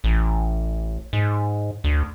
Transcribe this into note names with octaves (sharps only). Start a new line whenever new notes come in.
A1
G#2
D2